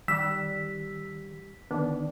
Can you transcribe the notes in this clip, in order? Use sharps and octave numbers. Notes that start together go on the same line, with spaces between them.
D#3 G3 E6 F#6 B6
D3 D#3 B3 D4